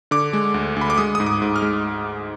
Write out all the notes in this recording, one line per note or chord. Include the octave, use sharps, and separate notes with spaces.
D3 D6
G#3
D2
D2 B5
D6
G#3 D#6
G#2 D#6
D6
G#2
F6
G#3